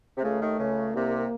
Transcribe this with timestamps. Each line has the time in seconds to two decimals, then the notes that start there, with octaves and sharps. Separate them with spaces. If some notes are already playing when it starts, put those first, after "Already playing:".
0.18 C3
0.23 C#2 C#3 A3
0.41 D#2 D#3
0.59 C#2 C#3
0.94 C2 C3 A#3